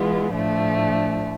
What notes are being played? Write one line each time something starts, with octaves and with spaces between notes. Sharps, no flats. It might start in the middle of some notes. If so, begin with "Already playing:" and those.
Already playing: E3 G#3 B3 F4
A2 F3 A3 D4